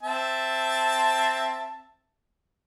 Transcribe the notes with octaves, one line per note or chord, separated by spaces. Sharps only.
C4 E5 A5